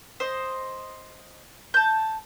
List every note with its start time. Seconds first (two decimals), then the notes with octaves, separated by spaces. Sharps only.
0.20 C5 D#5
1.74 A5 G6